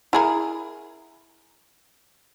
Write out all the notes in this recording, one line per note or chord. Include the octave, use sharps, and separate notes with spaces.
E4 G#4 A#4